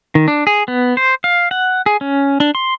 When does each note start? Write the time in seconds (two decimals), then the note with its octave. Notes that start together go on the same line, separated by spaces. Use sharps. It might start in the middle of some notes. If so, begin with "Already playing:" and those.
0.15 D#3
0.28 D4
0.47 G#4
0.68 B3
0.97 C5
1.24 F5
1.51 F#5
1.86 G#4
2.01 C#4
2.40 D4
2.55 C6